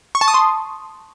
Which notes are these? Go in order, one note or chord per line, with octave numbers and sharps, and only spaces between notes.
C#6
A5
D#6
C6